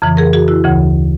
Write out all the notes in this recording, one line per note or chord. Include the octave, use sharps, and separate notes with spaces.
F2 C#3 E3
G#4 A#4
F#4 G#4
E4 F#4
D2 C#3 E3